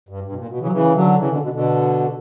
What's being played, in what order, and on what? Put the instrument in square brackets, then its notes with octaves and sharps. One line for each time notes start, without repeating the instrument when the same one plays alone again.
[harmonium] G2
G2
B2
A#2
B2
C#3 E3
F#3
C#3 E3
D3 F#3
C#3 E3
B2 D3
B2 D3
B2 D3